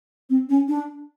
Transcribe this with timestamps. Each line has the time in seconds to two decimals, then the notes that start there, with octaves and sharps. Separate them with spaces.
0.30 C4
0.49 C#4
0.68 D4